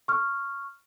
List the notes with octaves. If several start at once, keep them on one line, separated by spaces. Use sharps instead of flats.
C#6 F6